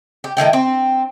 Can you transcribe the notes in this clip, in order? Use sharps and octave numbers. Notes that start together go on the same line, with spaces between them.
G4
A2 D#3 E4 G5
C4